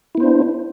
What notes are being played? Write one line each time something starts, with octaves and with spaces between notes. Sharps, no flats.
B3 D4 E4 C5